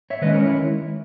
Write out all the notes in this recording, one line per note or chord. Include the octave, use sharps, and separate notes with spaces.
C#5 E5
D#3 G#3 C#4 B4 D#5
A#4 C#5
E4